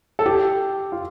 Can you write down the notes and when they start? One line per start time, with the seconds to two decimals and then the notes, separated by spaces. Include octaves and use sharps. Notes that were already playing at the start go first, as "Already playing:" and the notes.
0.19 A4
0.26 G4
0.92 F4